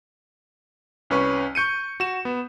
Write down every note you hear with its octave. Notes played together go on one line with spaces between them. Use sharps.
C2 C#4 B4 C#6
C#6 G6 C#7 D#7
F#4 E7
B3